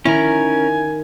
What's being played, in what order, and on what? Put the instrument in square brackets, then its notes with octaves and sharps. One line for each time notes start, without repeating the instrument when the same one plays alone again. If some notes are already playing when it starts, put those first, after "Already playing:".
[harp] D#3 [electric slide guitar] C#4 A#4 [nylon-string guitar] E4 [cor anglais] G#5